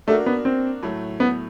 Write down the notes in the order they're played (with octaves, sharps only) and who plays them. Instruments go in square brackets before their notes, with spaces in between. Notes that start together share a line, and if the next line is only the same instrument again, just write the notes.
[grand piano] A3 [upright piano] A#3 D4 F#4 A#4
[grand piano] B3
C4
[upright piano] A2 F#3 A3
[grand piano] B3